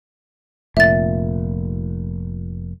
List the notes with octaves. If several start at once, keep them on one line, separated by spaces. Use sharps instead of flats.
F1 A#2 E5 A6